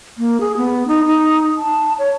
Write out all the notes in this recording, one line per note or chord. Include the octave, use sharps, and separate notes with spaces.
A#3
G#4
B3
D#4
D#4
A5
C#5